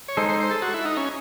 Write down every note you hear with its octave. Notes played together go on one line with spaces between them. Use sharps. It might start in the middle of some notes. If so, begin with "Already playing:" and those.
C#5
G#3 D#4 A4 C5
C5
C5
A4
F#4
E4
D#4
C#4